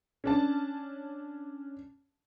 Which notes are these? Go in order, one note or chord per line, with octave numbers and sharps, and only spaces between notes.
C#4 D4 A5